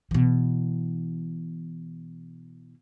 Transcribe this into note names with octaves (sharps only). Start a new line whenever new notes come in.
B2 E3